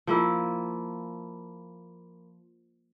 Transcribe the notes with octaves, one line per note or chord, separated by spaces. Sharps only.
F3 A#3 E4